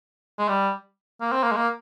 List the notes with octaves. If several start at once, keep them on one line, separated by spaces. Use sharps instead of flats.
G#3
G3
A#3
C4
A#3
G#3
A#3